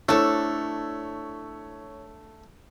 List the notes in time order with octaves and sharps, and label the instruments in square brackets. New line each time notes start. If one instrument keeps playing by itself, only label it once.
[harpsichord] A3 [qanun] D4 A4 [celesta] E4 C5 [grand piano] C#5 E6